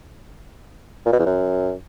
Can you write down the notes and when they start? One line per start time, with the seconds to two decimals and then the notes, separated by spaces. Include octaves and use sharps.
1.06 A#2
1.13 B2
1.19 E2
1.26 F#2